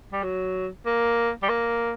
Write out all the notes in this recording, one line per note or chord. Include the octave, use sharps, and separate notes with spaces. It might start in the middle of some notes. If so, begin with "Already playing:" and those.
G3
F#3
A#3
G3
A#3